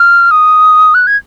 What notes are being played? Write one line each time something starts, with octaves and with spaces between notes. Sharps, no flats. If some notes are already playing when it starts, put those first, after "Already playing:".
Already playing: F6
D#6
F#6
G#6